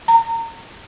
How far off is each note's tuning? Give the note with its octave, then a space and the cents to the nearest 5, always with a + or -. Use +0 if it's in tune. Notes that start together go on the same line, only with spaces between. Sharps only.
A#5 -25